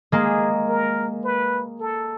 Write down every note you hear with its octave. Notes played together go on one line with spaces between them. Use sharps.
G#3 A#3 G#4
A#4
B4
A4